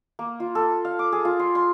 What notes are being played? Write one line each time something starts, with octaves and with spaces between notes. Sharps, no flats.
A#3
F4
A4
F5
D6
G#4
F4
C6
C6